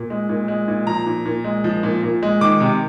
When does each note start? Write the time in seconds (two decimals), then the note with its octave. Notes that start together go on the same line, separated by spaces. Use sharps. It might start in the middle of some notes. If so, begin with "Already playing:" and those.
Already playing: A#2
0.10 G#3
0.29 A#2
0.48 G#3
0.68 A#2
0.87 F3 A#5
1.06 A#2
1.25 A#2
1.44 G#3
1.64 F3
1.83 A#2
2.03 A#2
2.23 G#3
2.41 D#3 D6
2.60 C3